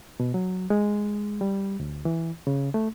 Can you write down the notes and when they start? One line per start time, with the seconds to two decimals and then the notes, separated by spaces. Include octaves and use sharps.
0.20 B2
0.34 F#3
0.70 G#3
1.41 G3
1.80 D2
2.05 E3
2.47 C#3
2.74 A3